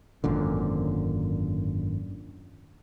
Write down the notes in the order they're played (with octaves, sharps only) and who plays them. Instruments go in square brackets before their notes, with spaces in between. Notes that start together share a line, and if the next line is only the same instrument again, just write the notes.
[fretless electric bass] G#1 F#2 A#2 D3